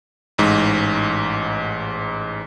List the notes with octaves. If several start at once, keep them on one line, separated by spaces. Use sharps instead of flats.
A1 G#2